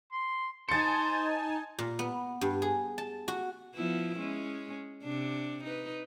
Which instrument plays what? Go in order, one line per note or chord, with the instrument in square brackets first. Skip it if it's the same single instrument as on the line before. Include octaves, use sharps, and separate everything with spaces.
[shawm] C6
[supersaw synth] D#4 G#5 A5 [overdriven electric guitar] C5 [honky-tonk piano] A6 C#7
[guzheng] A#2
B3
G2
G#4
A5
F#4
[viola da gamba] F3 B3 E4
G#3 C#4
C3 D4
D#4 B4